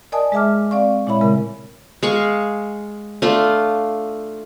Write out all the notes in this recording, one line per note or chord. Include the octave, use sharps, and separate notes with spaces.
A#4 D5 D#5 G#5 A5 D#6
G#3 G#4 E5 A5 D6 F6
C4 D5 F5 C#6
A#2 G#3 E4 C#5 E5 B5
C#3 G#3 A#4
G#3 F5 C#6
A3 D4 F4